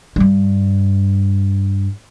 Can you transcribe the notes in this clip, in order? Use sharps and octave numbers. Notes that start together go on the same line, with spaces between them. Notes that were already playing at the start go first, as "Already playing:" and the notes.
G2 G3